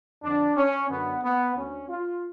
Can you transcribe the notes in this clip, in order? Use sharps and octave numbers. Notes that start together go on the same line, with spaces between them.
F2 D3 D4
C#4
F#2 D3 B3
B3
D2 D3 C#4
F4